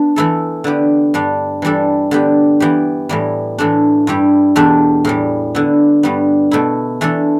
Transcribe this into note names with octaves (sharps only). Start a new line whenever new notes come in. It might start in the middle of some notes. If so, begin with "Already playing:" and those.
Already playing: B3 D4
E3 A3 E4 A4
D3 B3 G4
G2 G3 D4
E3 G3 D4 A4
D3 B3 G4
E3 B3 G4
A2 E3 G3
A2 E3 A3 D4
G2 G3 E4 G4
E2 B2 A3 D4 G4
A2 E3 G3
D3 B3 E4
G2 G3 B3
B2 A3 E4
E3 A3 D4 A4